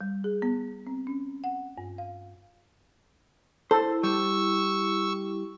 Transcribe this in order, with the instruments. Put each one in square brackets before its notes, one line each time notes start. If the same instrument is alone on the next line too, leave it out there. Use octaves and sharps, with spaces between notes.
[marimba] G3
G#4
B3
C4
C#4
F#5
G2
F5
[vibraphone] E4 [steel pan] A4 [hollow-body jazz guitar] C5
[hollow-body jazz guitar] G3 [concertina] C#6 E6